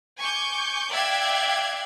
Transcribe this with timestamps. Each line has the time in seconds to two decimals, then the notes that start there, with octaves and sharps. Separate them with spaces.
0.19 G#5 C#6 D6 G6
0.90 D5 E5 F5 G5 F#6 G#6